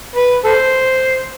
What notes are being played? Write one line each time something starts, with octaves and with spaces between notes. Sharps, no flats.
B4
A4 C5